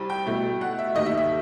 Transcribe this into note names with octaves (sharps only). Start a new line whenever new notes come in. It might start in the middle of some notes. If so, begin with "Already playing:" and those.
Already playing: C2 G3
G5
B2 A3 E4
F#5
E5
D#2 D#3 A3 D#5
E5
E5